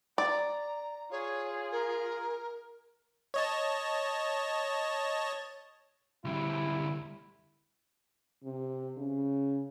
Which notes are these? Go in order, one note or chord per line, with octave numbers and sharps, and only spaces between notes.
D5 A#5
F4 G#4 C#5
A#4
C#5 D#5 A5
D2 G3 E4
C3
C#3